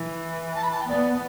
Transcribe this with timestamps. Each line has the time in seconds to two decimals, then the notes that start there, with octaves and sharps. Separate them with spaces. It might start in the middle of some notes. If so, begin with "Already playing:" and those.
Already playing: E3
0.55 A5
0.63 B5
0.72 A5
0.80 G5
0.88 B3 D5